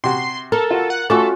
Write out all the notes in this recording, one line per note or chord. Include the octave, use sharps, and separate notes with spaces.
C3 F#4 C6
A4 A#4
F4 F#4
F#5
A3 C#4 F4 F#4 A4 E5 D6